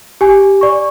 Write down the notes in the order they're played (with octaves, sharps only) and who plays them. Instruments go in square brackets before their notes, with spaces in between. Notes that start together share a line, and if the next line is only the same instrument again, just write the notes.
[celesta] G4 G#5
D5 C#6